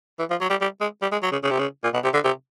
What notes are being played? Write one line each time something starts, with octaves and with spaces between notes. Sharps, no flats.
E3
F3
F#3
G3
G3
G#3
G3
G#3
F#3
C#3
C#3
C3
C#3
A#2
B2
C3
D3
C3